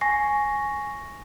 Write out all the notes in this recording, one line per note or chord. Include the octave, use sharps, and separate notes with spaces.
G#5 C#6 A#6 C7